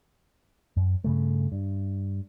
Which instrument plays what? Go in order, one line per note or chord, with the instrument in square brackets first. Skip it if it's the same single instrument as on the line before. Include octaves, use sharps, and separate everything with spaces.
[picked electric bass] F#2
G2 C#3 A3
G2